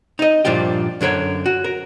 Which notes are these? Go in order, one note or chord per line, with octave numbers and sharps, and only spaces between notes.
D#4 D#5
G2 A#2 F3 D4 G4
F#2 D3 A#4 C#5
F#4
A#4